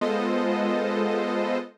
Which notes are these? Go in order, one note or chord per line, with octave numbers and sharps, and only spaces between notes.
G#3 B3 F4 A4 C5 D#5